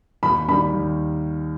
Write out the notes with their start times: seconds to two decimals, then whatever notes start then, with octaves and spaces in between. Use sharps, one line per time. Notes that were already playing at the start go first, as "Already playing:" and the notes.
0.23 D#2 B5
0.48 D#3 G3 B5
0.74 D#2